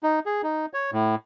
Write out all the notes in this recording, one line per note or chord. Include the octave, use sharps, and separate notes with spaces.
D#4
G#4
D#4
C#5
A2